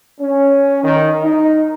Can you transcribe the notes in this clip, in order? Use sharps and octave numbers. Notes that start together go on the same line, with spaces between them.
C#4
D#3
D#4